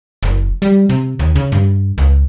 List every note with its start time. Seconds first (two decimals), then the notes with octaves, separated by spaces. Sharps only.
0.23 F#1
0.62 G3
0.89 C3
1.19 D#2
1.36 C#3
1.52 G2
1.98 C#2